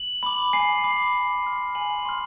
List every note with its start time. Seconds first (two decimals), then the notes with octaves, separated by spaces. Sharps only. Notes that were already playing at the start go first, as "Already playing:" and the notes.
Already playing: F#7
0.23 B5 D6
0.53 G#5 C7
0.84 B5 D6
1.14 G#5
1.44 C6 F6
1.75 G#5 F#7
2.05 C6 F6